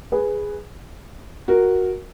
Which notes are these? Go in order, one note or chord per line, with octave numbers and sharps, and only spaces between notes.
G#4 B4
F#4 A#4